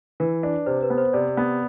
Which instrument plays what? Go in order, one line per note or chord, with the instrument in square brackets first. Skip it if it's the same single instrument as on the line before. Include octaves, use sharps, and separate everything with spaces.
[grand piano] E3 [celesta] B4
[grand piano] D4
[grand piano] C3 [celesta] C5
[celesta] B4
[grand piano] B3
[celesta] C5
[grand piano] C3 [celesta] D5
[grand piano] B3